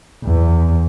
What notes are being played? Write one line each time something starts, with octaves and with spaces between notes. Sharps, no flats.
E2